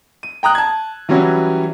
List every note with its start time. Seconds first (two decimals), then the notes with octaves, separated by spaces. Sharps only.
0.23 D#7
0.43 G5 A#5 D#6 F#6
0.55 A5 G#6
1.09 E3 F#3 G3 C#4 E4 F#4